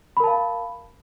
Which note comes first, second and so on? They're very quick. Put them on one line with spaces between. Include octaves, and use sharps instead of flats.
B5 A#4 A5 F5